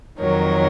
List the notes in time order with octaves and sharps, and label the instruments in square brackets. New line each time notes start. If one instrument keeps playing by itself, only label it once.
[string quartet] F2 D#3 F#3 A#4 C#5